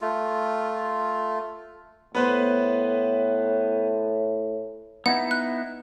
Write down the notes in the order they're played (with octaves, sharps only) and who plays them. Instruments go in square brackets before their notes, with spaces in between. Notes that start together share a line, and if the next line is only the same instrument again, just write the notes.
[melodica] A3 F4
[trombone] A2 [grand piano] B3 B4 C5
[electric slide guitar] B3 D#4 E4 [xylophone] F#5
[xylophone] F#6